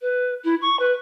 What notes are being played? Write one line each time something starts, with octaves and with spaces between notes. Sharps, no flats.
B4
E4
C#6
B4